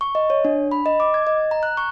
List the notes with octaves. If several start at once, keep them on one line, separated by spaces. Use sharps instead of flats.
C#6
D#5
C#5
D4
B5
D#5
D6
G#6
D#5
A#5
F#6
C#6